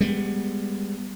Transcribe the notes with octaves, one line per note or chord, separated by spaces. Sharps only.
G3 G#3 B3